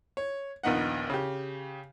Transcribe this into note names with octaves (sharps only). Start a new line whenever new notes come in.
C#5
A#1 D#2 B3 D#4 F#5
C#3 G4